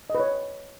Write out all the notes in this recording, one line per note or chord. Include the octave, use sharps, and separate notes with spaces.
D#5
B4
C#5